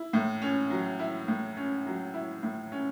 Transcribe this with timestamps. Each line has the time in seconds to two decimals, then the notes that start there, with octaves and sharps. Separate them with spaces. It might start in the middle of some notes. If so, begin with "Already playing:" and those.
Already playing: E4
0.13 A2
0.41 C#4
0.70 F#3
0.99 E4
1.28 A2
1.57 C#4
1.86 F#3
2.14 E4
2.43 A2
2.72 C#4